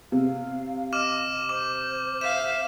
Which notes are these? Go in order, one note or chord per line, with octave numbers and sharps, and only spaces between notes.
C3 F5
D#5 D6 F6 E7
C5 D6
E5 F5 E7